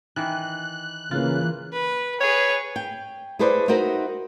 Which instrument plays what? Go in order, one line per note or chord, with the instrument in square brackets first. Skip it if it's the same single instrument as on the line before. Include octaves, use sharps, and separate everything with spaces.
[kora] D#3 E3 [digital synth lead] F#6
[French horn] C#3 [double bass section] E3 A#3 [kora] F4
[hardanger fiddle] B4
[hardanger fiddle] G#4 B4 [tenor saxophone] C#5
[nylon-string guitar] G5
E4 G#4 A4 B4 C5 D5
D#4 F#4 A#4 C5 E5